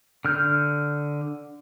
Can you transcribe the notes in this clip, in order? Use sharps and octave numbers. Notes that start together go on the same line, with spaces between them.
D3 F6 G6